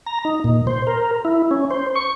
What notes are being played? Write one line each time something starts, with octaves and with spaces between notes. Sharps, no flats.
A#5
D#4
A#2
C5
A#4
E4
C#4
C5
C#6